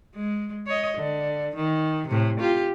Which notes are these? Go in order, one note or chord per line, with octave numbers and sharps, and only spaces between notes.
G#3
C#5 D#5
D3
D#3
A2 C3
F4 G4